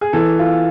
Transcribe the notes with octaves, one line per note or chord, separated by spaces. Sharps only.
G#4
E3 A4
F4